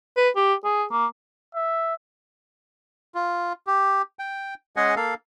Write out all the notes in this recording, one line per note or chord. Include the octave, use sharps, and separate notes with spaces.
B4
G4
G#4
A#3
E5
F4
G4
G5
G#3 C#4 G#4 D#5 F#5 G#5
A#3 A4 F5